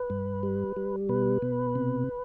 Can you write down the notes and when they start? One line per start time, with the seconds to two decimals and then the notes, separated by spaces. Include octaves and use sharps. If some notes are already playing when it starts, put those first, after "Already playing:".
Already playing: B4
0.10 G2
0.43 G3
0.76 G3
1.09 B2 B4
1.42 B2
1.75 C3